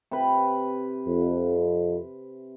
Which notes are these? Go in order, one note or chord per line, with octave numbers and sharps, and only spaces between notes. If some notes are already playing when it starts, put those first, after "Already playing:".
C3 B4
F2